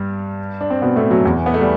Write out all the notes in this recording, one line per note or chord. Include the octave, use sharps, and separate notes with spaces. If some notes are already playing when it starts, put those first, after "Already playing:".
Already playing: G2 G3
D4
C4
B2 B3
A2 A3
F#2 F#3
E2 E3
B3
A3
G3